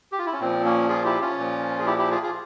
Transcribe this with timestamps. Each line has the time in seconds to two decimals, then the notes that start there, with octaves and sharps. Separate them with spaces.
0.12 G4
0.19 F4
0.26 E4
0.33 C#4
0.40 A#2 F3 C4
0.65 A#3 C#4
0.89 F4 G#4
1.05 E4 G4
1.21 C#4 F4
1.38 A#2 F3
1.79 G#4
1.86 E4 G4
1.98 E4 G4
2.11 F4 G#4
2.23 F4 G#4